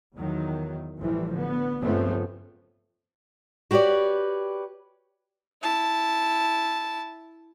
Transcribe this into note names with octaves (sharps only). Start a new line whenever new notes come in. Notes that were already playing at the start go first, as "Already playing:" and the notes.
E2 D#3 F#3
A1 E3 F3 G3
D3 B3
G2 C#3 F3 A3 B3 C4
F#4 G4 B4 C#5 D5
E4 A5